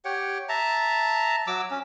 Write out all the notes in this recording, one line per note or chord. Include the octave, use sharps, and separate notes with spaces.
G4 C#5 F#5 G5
E5 A5 A#5
F#3 D6 E6
C#4